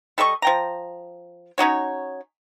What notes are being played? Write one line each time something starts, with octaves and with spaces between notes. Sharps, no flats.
G3 A4 D#5 C#6
F3 G5 A#5
C#4 D#4 F#4 C#5